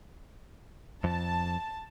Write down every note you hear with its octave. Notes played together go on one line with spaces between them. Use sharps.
F2 A5